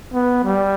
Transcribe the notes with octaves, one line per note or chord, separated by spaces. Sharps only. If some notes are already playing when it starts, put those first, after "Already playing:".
B3
G3